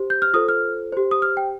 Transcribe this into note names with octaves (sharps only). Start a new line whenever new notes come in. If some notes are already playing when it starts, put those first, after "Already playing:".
Already playing: G4 C5
G6
F6
F4 A4 C5 D#6
F6
G4 C5
D#6
F6
G5